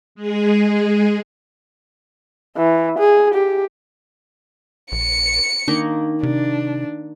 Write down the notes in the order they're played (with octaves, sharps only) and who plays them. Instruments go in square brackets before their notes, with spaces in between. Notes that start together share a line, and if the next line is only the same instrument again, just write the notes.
[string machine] G#3 G#4
[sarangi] E3
G#4
G4
[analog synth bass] A#1 [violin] C#7
[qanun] D#3 A#3 D#4 [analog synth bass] D4
[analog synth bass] C3 [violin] D4